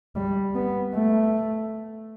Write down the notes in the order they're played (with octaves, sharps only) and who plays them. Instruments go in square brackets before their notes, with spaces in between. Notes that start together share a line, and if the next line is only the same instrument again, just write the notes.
[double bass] G3
B3
A3